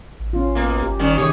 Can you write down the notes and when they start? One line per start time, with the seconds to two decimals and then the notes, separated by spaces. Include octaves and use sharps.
0.20 A1
0.33 C#4 F4
0.55 B2 A#3
0.83 G1 G4
0.99 D#3 G3 C#4
1.18 C3 D#3 G4 G#4 C#5